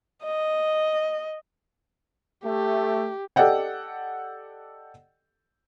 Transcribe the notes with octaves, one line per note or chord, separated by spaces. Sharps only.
D#5
A3 G4
G4 A4 D5 D#5 F#5 G5